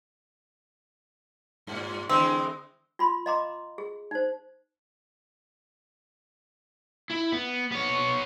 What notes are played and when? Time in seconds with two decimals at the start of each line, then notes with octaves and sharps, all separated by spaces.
1.67 G2 A#2
2.09 D3 E3 G#3 C4
2.99 F4 B5 C6
3.26 D#5 F5 A#5 C6 D6
3.78 G#4
4.11 D#4 C5
7.11 E4
7.33 B3
7.72 B3 C#5